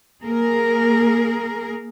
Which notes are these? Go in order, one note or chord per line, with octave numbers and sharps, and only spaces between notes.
A#3 G#4 A#4